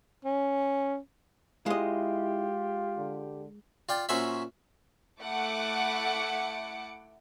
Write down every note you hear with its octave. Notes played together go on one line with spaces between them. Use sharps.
C#4
G#3 E4 F4 G4 D#5
D3
F4 D5 G5
A#2 C#4 F#4 C5 E5 B5
A3 E4 F#5 D6 C#7